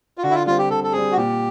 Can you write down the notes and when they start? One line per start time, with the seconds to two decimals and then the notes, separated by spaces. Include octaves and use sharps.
0.18 F4
0.23 D3 F#4
0.31 E4
0.35 F4
0.46 G3 C4 F4
0.58 G4
0.70 D3 A4
0.84 A4
0.93 G3 C4 G#4
1.12 F#4
1.17 A#2 G4